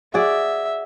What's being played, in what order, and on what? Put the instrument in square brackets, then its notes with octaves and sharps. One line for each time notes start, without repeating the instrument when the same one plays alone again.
[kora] F#4 G#4 D5 [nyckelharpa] E5